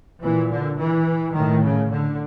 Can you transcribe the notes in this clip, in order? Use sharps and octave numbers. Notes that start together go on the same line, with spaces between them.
A#2 E3
D3
E3
A2 D#3
C#3
D3